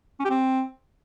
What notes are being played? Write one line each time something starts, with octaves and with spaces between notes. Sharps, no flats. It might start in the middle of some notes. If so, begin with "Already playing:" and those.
C#4
G4
C4